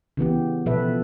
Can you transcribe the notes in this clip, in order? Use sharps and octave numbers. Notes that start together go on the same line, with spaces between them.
C#3 E3 B3 G4
B2 F3 A4 B4 E5